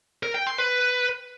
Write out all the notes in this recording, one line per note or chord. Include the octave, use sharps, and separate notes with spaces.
A#4
G5
C6
B4